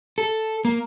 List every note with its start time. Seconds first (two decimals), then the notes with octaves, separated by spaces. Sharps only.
0.18 A4
0.65 A#3